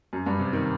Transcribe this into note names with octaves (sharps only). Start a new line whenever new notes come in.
F#2
G2
C3
D#3